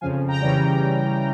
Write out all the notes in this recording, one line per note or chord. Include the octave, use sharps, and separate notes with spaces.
F2 C#3 F3 F5 G#5
G5 A#5
C#3 E3 G3 C#4 G5 A#5